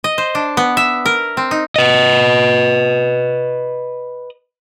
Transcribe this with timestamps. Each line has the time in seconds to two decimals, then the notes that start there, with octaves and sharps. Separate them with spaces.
0.04 D#5
0.18 C5
0.35 D4
0.57 B3
0.77 E5
1.06 A#4
1.37 C4
1.51 D#4
1.76 B4 D#5